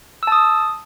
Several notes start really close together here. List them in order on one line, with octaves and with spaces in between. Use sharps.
E6 A5 D#6